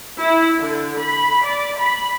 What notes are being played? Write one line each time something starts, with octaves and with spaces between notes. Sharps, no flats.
E4
D3
B5
D5
B5